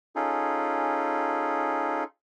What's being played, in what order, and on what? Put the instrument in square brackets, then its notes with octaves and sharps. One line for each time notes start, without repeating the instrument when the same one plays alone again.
[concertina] C#4 D#4 F4 G#4 A4